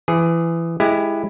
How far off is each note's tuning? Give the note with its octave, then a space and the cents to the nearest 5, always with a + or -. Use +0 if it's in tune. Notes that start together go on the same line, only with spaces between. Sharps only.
E3 +20 G#4 +0
G#3 +15 E4 +0 G4 +25